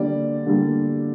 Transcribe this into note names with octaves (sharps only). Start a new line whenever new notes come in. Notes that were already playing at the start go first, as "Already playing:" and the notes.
Already playing: D3 G3 A#3 D5
D3 G3 A#3